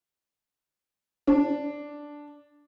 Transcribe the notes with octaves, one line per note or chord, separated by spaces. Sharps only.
D4